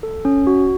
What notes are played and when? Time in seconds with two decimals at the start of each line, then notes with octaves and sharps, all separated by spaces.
0.03 A4
0.25 C#4
0.47 F#4